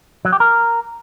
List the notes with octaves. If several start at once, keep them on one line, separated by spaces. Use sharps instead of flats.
F#3
G4
A#4